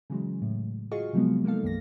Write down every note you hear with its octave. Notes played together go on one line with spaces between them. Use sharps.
C#3 E3 F#3 G#3
A2
F4 F#4 G#4 D#5 F5 C#6
C3 F3 F#3 G#3 B3
G#3 A#3 D#4 A4 F5
B1 F#2 D#3 A#3 A#6